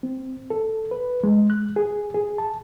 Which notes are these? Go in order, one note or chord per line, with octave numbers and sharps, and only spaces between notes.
C4
A4
B4
G#3
F#6
G#4
G#4
A5